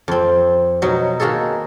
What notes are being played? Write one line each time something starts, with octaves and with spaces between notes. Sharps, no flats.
F2 C4
B2 F#3 D#4
D#3 A#3 F#4 G#4 A4